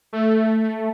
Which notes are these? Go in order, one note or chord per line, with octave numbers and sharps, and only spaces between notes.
A3